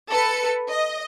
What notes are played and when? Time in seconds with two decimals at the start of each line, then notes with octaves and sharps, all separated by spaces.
0.10 A4 B4 C#7
0.69 D#5